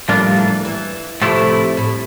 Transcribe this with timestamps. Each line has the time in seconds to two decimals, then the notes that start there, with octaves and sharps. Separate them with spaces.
0.08 A2 F3 G3 A#3 D4 F4
0.37 E3
0.65 E3
1.21 A2 C3 F3 A3 E4
1.77 A2